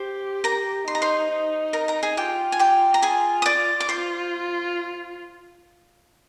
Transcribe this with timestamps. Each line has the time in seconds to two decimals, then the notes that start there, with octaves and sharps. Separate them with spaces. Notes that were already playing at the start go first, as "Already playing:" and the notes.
Already playing: G4 C5
0.44 A#4 A#5
0.87 D#4 C6
0.95 A#5
1.02 C5 C6
1.31 D#4
1.73 A#4 A#5
1.88 A#4 A#5
2.03 G#4 G#5
2.17 F4 G4 G5
2.52 G#5
2.59 G4 G5
2.94 A#5
3.02 F4 G#4 G#5
3.42 D#6
3.46 D5 D6
3.80 D6
3.89 F4 C5 C6